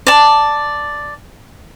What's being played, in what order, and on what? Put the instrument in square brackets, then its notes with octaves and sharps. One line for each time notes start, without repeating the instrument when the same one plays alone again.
[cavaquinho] D5 A5